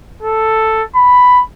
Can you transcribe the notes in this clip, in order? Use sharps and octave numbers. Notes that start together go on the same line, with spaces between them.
A4
B5